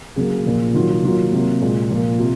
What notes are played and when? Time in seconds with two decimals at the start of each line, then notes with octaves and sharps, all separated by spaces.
0.16 C#3 F#3 A#3 G#4
0.31 G#4
0.45 A#2 F3 A#3
0.74 D#3 F#3 A#3 F4
0.88 F4
1.03 D#3 F#3 A#3 F4
1.32 C3 F#3 A#3
1.61 A#2 G#3
1.90 A#2 F3 A#3
2.19 C3 F4